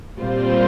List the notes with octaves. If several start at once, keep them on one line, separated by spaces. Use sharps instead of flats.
A#2 G3 C4 F4 C5